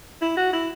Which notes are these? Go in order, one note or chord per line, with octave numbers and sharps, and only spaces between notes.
E4
F#4
E4